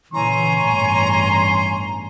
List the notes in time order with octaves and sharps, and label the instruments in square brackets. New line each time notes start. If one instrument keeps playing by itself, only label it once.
[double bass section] A#2 C#3 E3 [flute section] C#5 G#5 C#6 [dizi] A#5 [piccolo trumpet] C6
[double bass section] A1 E2 G2